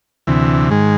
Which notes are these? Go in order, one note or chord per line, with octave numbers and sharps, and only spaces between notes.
D2 C3 E3
G#2 D#3 G#3